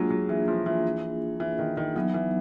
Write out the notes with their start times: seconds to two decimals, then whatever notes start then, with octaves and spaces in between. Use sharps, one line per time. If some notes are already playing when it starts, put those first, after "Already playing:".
Already playing: F#3 G#3 A#3 D4 F4 G#4
0.10 F#3
0.29 E3
0.48 F3
0.66 E3
1.40 E3
1.59 D#3
1.77 D#3
1.96 E3 F#3 B3 D#4
2.14 E3